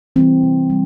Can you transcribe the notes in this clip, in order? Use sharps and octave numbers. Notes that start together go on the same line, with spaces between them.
E3 G3 C4
C3
G3